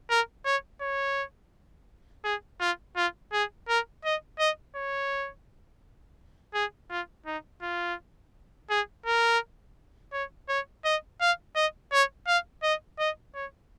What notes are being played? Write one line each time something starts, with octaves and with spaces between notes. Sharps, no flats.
A#4
C#5
C#5
G#4
F4
F4
G#4
A#4
D#5
D#5
C#5
G#4
F4
D#4
F4
G#4
A#4
C#5
C#5
D#5
F5
D#5
C#5
F5
D#5
D#5
C#5